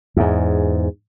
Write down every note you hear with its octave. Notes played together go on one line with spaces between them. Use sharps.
E2 G#2